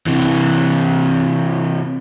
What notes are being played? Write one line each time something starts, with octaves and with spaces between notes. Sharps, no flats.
C3 E3